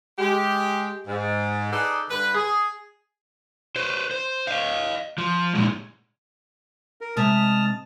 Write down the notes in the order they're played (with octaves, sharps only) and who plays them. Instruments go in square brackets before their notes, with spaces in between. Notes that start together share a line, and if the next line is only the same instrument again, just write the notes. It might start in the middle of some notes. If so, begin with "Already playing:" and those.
[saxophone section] G#3 G4
G#2
D#4 G#4 A4 B4 D5
G2 D3 B4
G#4
[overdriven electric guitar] B4 C5
C5
D#5 F5
F3
A#2 G#3
[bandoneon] A#4
[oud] C3 G#3 E5 [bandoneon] A5 D#6 F6